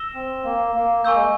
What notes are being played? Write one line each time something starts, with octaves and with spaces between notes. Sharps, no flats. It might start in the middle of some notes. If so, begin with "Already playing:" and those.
Already playing: E6 A#6 E7 G7
C4
A#3
A#3
A#3 G#5 C#6 E6 G6
G#3